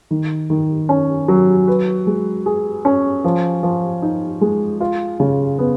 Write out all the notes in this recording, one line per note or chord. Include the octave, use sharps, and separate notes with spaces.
D#3
D#3
C#4
F#3
B4
G#3
G#4
C#4
F3
F3
D#4
G#3
F4
C#3
B3